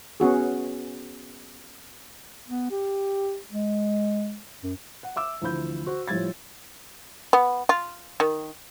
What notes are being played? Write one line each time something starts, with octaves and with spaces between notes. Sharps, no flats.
B3 C#4 F#4 G#4
B3
G4
G#3
F#2
F#5
E5 D6 E6
D2 E3 F3 B5 G6
F#4 C5
A2 F3 G3 G#6 A6
B3
F4
D#3